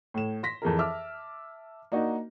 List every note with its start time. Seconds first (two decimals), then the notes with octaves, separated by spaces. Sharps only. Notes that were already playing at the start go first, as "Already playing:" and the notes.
0.14 A2 E7
0.43 C6 A#6 B6
0.62 F2 E3 G#4 A#4
0.79 E5 A5 D6 E6 F6
1.92 A#3 D4 D#4 F#4